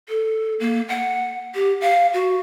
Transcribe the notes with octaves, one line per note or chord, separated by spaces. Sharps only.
A4
A#3
F#5
G4
F5
F#4